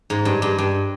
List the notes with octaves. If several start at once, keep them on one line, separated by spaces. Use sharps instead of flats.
G#2
G2
G2
G2